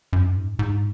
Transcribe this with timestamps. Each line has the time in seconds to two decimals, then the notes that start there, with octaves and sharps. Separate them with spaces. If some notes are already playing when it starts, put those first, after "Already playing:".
0.13 F#2
0.37 G#2
0.59 G#2